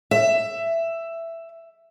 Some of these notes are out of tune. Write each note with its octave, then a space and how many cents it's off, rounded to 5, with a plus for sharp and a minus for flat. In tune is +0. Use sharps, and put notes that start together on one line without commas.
E5 +10